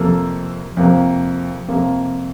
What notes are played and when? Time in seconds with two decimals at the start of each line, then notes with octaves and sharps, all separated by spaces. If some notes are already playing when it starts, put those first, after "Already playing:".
Already playing: F2 C3 F3 A#3 A4
0.77 F2 C3 F3 A#3
1.68 F2 C3 F3 A#3